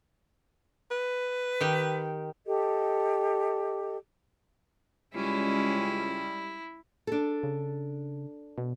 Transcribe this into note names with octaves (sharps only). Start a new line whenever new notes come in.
B4
D#3 G4
G4 A4 D#5
C#2 G3 G#3 C#4 E4
D4 A4
C#3
B2